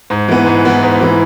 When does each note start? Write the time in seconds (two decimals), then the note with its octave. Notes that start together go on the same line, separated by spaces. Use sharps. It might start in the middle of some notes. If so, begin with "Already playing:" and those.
0.10 G#2
0.28 E3 B3
0.46 G#2
0.65 E3 B3
0.82 G#2
1.01 E3 B3